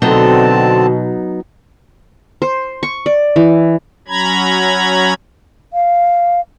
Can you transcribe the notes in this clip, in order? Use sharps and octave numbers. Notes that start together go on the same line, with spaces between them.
B2 D3 F#3 B3 C4 D#4 A5
C5
C#6
D5
E3
F#3 C#4 A#5 B5 G#6
F5